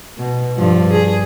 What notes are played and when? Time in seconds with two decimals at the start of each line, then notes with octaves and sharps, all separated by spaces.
0.17 B2
0.56 G2 F3
0.92 G#4